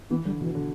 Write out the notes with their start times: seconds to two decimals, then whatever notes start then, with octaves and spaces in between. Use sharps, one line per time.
0.10 E3 B3
0.25 D3 G3
0.41 B2 E3
0.55 D3